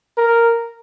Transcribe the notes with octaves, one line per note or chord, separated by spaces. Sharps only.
A#4